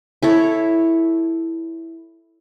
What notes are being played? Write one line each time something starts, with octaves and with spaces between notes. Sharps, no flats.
E4 A4 C#5